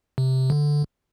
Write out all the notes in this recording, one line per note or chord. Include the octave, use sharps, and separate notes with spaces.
C3
D3